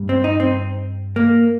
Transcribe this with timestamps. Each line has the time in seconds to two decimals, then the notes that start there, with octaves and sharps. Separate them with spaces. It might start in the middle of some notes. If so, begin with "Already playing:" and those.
Already playing: G2 G3
0.09 C4
0.24 D#4
0.40 C4
1.16 A#3